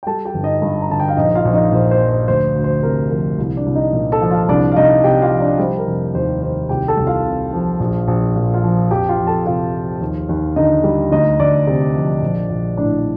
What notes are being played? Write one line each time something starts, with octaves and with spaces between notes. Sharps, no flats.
G5
G3 A4 A5
G4 G5
G1
D#4 D#5
G2
A#5
D3 A5
G5
F5
A#1 D#4 D#5
F4 F5
A#1
D#4 D#5
A#2 C5
C5
F3
C5
D2 C5
D2
C5
C3 A#4
F3 A#4
C2
D4 D5
C2
D#4 D#5
A#2
A4 A5
F3
F4 F5
C2 D4 D5
F5
C2 D#4 D#5
C3 G4 G5
F4 F5
F3
D4 D5
G3 C5
A#4
F1
D#2 C5
D#3 C5
C2 G4 G5
A4 A5
C2
F4 F5
C3
F3
A#1
A#1
A#2
F4 F5
F3
F2 G4 G5
F4 F5
F2
A4 A5
C3 F4 F5
F3
D#2
D#2
D3 D#4 D#5
G3
D2 D#4 D#5
D2 D4 D5
C3
F3
A#1
A#1
A2 D4 D5